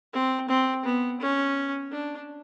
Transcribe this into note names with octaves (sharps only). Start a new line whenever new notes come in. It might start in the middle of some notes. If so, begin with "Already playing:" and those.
C4
C4
B3
C#4
D4